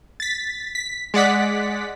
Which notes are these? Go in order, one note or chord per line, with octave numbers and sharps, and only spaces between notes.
A6 B6
B6
G#3 D5 F#5 B6